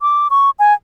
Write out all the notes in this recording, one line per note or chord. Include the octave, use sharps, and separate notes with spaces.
D6
C#6
G#5